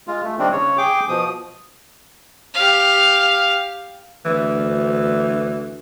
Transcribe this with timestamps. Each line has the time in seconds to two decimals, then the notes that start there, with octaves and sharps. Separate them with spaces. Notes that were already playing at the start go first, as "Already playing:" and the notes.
0.08 G#3 F4
0.24 A3
0.39 D#3 G3 A#3 C4 D4
0.52 C#3 C#5
0.78 G#4 G5 D6
1.09 B2 F3 D#6
2.54 G4 F5
4.26 D2 E3